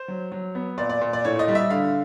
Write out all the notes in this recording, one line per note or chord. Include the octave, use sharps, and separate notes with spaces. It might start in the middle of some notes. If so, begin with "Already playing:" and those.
Already playing: C5
F#3
F#3
B3
A#2 D5
D5
A#2
D5
A2 C#5
D#5
G3
E5
D3 F5